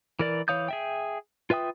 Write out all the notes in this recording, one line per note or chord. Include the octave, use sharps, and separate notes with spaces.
E3 A#4 D5
E3 C#5 F5 D#6 G6
G#4 E5 G5
F4 B4 E5 G5 D#6